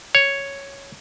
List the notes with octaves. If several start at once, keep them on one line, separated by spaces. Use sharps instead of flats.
C#5